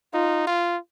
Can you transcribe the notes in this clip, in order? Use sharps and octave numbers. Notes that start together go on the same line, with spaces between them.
D#4 F4
F4